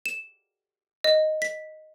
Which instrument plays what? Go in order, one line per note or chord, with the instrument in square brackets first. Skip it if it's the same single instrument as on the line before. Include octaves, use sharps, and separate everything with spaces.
[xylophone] E7
D#5
B6